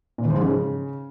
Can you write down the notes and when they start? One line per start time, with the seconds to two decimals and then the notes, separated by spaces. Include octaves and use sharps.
0.18 A#2
0.24 E3
0.30 F3
0.36 G#2
0.42 C#3